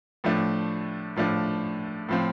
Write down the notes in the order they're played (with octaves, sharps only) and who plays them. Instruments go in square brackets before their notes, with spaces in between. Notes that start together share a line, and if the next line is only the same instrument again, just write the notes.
[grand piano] A2 F3 A3 D4
A2 F3 A3 D4
A2 F3 C4